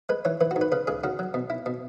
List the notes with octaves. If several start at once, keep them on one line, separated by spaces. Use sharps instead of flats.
G#3 B4
E3 C#5
E3 B4
F#4
G#2
B4
C#3 B4
C#2 G#4
C#3 F#4
F#3
B2
E4
B2